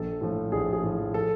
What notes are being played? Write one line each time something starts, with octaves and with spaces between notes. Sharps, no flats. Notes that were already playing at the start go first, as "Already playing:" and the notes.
Already playing: A#1 A4
A2 F3
A#1 G#4
G#4
A2 F3
A4